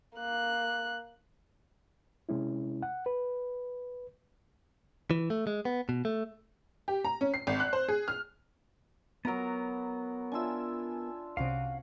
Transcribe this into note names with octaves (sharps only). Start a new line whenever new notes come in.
A#3 F#6
C3 G#3 C#4 E4
F#5
B4
E3
A3
G#3
B3
B2
A3
G4
A#5
C#4
C7
G#1
F#6
C5
G#4
F6
F#3 B3 F#4 A#4 A#5
D4 F4 E5 G#5 E6
C2 C3 C#4 F#4 F5